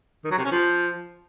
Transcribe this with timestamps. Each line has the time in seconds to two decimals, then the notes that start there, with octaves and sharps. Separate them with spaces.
0.25 D#3
0.31 F#3
0.38 C3
0.45 C#4
0.51 F3